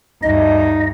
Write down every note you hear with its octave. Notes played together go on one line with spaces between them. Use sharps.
D2 G2 D#4 D#5